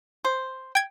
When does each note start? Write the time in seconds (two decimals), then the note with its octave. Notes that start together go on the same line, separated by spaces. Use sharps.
0.25 C5
0.75 G5 G#6